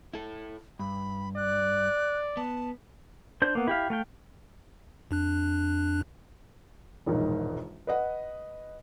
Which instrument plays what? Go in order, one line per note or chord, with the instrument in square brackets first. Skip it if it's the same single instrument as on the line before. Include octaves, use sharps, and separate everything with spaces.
[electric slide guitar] E4 A4
[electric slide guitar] G2 [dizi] B5
[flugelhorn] D5 [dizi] F#6
[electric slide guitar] B3 [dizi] A5
[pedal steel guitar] D4 C5 G6
A#3 B3
E4 G4 F5
A3 F5 G5
[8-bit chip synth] F2 D4 F#6
[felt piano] E1 A#1 G#2 D#3
B4 D#5 F#5